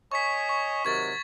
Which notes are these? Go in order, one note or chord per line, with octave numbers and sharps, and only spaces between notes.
C#5 D#5 G#5 C#6 B6
C#6
C3 D#3 F#3 C#6 G#6 A6